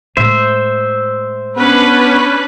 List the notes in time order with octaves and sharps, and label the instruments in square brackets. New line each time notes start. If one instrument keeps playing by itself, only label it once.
[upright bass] A2 G#3 [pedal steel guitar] C5 E5
[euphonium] B3 [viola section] C#4 D4 B4